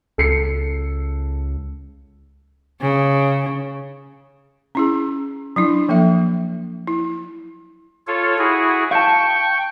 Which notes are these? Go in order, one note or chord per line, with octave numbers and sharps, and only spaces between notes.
C#2 A4 C7 C#7
C#3
C#4 E4 G#4
F#3 D4 E4
F3 A#3 A4 E5
E4
F4 A4 C#5
E4 F#4 G#4
F5 G5 A5 C#6